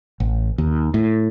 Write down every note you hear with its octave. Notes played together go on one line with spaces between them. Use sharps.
A1
D#2
A2